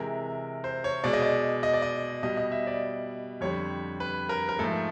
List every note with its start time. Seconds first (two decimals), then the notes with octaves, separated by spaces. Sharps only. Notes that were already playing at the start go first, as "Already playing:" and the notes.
Already playing: C3 E3 G#3 A#4
0.64 C5
0.84 C#5
1.04 B2 G#3 D5
1.13 D#5
1.22 D5
1.63 D#5
1.73 D5
1.82 D#5
2.23 B2 G3 D#5
2.37 D#5
2.52 E5
2.67 D5
3.41 F2 D3 G3 C#5
4.00 B4
4.29 A#4
4.49 A#4
4.59 G#2 F3 A3 A4